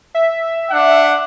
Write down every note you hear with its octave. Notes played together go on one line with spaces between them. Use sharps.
E5
D4 F#5